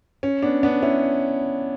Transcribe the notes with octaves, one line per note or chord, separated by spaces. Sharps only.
C#4
B3 D4
B3 D4
C#4 E4